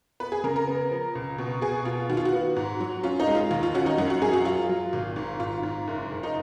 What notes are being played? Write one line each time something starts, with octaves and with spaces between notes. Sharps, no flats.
B3 B4
G#4
C#3 A#4
A#4
B3
F3
C#2
B2
B2 G#4
B2 F4
D#3 F#4
F4
F#4
B3
G#2
F#3
C#4 F4
D#4
G#3
F4
D#2 F4
F4
C#4 F#4
D#4
F#2 F#4
F#4
F#2 G#4
F#4
F#3 F4
F#3
G#1
G#2
G#2 F4
G#2
F#1
F#1
D#4